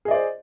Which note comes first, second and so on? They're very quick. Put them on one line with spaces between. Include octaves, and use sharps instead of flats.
G#4 D#5 D5 C5